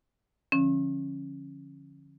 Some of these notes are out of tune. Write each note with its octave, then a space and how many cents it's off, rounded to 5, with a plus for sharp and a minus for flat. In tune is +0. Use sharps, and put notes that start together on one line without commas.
D3 -5 F3 +0 C#4 -20